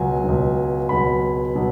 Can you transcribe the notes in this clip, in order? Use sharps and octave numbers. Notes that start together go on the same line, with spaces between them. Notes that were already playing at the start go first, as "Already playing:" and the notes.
Already playing: C#2 B2 F#3 G#5
C#2 B2 F#3
C#2 B2 F#3 B5
B2 F#3